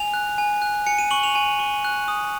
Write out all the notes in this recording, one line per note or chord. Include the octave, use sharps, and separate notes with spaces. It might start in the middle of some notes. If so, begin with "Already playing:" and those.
Already playing: G#5 F7
F#6
G#5
F#6
G#5 C#7
D#7
C#6 F#7
F7
G#5 D#7
C#6
F#6
D#6